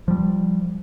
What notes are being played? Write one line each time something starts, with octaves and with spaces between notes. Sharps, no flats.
F3 G3